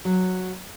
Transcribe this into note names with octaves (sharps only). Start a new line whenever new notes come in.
F#3